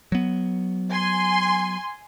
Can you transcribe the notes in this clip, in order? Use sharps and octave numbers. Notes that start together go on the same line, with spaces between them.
F#3 B3
G#5 C6